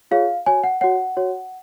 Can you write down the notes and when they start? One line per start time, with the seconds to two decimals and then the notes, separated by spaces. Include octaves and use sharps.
0.11 F4 G#4 C#5 F5
0.46 F#4 C#5 G#5
0.63 F#5
0.81 F#4 C#5 F#5
1.17 F#4 C#5